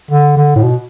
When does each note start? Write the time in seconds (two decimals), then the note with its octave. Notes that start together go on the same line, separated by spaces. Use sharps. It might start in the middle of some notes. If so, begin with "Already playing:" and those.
0.11 D3
0.37 D3
0.56 A2
0.64 B2